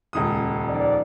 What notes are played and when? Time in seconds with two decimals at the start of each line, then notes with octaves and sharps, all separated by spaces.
0.13 D#1 C#2 D#6
0.69 D#3 F3 D5